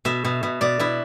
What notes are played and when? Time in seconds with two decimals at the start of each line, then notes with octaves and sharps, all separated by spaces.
0.05 B2 E5
0.24 B2
0.43 B2
0.61 B2 D5
0.79 B2 E4